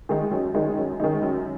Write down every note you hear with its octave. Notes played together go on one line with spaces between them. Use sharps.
D#3 G#3 D#4
F#2
D#3 G#3 D#4
F#2
D#3 G#3 D#4
F#2